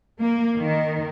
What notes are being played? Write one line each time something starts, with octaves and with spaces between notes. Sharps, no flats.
A#3
D#3